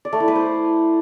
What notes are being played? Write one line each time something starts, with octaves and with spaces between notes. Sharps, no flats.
D5
A3
E4
B4
C5